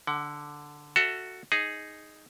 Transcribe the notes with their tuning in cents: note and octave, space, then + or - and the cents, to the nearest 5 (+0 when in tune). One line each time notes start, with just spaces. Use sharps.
D3 +0 F#5 +30
F#4 +0 A4 +20 E5 +15
D#4 +0 G#4 +0